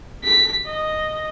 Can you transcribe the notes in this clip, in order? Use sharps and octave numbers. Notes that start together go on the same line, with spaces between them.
B6
D#5